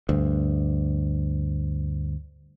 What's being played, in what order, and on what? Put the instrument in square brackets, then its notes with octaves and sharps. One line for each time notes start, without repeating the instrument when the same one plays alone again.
[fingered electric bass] D2 G2